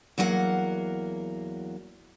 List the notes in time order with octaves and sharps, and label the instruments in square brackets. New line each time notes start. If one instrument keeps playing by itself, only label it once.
[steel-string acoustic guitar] E2 F#3 A#3 A#4 F#5